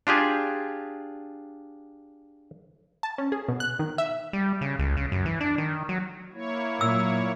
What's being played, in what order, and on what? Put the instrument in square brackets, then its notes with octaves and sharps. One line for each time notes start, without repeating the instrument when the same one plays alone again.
[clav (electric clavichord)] D4 F4 G4 G#4
[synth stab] A5
C#4
G#4
B2
F#6
D#3
E5
[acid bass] G3
C#3
C#2
C#3
F#2
E3
D4
D#3
F#3
[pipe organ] A#3 E4 C#5
[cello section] A#2 F#3 [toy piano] E6